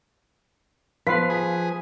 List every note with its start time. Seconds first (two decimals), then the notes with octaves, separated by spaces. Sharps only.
1.07 F3 B3 B4 F5 B6
1.30 G#4